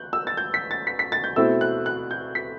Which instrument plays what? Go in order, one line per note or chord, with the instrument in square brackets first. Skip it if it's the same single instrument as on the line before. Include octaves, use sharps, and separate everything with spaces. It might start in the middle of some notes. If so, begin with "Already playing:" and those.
Already playing: [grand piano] F#6 G6
E6
A6
G6
B6
A6
B6
B6
A6
G6
B2 A3 C4 E4 E6
F#6
F#6
G6
B6